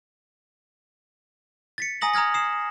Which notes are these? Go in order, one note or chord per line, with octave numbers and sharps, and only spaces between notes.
A6 B6 C#7
G#5 A#5 D#6 A#6 F#7
A#5 D#6 F6 G#6 A#6
D#6 C7 E7